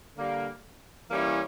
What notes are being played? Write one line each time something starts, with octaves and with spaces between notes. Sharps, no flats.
D3 G3 A#3
E3 G3 A#3 C#4 E4